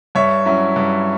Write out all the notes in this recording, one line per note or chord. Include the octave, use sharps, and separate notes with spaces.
G2 C#5 E5
F#3 C#4 E4
G2